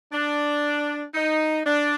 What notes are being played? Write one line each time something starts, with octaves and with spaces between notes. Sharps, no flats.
D4
D#4
D4